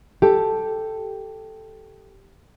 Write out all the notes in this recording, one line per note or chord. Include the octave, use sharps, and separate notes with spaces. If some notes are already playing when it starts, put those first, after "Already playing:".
G4 A4